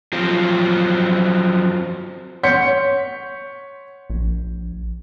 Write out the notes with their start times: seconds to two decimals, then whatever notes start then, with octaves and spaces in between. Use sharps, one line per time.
0.13 F3 F#3 C4 F4
2.43 C#5 F#5 C6 G6 B6 C#7
4.10 A#1